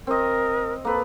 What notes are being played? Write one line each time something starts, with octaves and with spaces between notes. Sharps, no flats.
C4 A#4 D#5
A#3 A4 B4